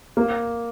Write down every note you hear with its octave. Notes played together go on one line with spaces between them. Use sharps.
A#3